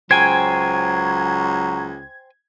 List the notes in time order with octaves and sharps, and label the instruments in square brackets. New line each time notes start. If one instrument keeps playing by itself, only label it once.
[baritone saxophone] C#2 [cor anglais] F#3 [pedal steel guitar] C5 G5 G#5 [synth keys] G#6